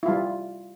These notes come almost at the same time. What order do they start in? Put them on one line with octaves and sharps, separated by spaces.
E4 F4 G3